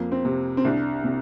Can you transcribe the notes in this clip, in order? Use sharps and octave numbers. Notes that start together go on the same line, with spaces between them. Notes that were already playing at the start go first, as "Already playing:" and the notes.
Already playing: F2 A#3
C4
C3
C4
C2 D4
C3